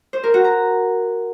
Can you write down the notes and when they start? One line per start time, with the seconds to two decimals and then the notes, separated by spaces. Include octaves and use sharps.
0.13 C5
0.23 A#4
0.34 F#4
0.44 A#5